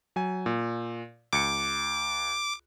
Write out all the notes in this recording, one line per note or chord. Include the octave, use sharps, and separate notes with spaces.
F#3 G#5
A#2
C#2 D6 C#7